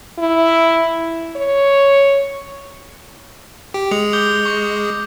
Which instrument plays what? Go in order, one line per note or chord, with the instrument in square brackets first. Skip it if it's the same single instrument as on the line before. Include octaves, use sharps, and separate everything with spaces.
[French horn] E4
C#5
[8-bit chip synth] G4
[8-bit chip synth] G#3 [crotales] D#6 C#7 F7
[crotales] D6 G6 G7
C#6